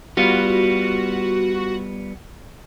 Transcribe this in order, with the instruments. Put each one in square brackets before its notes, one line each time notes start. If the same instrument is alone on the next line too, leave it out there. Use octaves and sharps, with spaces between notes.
[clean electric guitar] G3 B3 F4 [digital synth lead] F#4